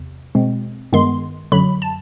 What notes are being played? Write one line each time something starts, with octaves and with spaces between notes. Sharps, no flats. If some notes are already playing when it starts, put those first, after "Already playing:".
Already playing: E2 C3
B2 G#3 C4
G2 D#3 G#3 B3 C6
F#2 D3 F#3 B5
A5